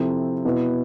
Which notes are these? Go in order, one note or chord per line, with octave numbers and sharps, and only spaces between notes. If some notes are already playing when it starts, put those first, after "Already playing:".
Already playing: C3 F3 C4 E4 A4
B2 B3 E4 B4